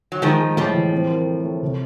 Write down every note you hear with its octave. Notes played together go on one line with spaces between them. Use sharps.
F#3
D#3 F3 G#3
G#3
A2 F3 G3
E3
C4
A#4
A3
A3
C3